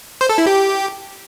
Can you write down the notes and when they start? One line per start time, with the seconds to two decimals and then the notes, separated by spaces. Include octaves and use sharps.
0.21 C5
0.29 A4
0.38 E4
0.47 G4